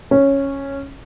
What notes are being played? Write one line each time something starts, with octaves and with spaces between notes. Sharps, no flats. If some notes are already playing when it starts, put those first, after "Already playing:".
C#4